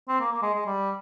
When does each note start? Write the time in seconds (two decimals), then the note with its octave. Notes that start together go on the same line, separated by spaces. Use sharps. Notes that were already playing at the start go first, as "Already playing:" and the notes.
0.08 C4
0.20 A#3
0.31 A#3
0.42 G#3
0.54 G#3
0.66 G3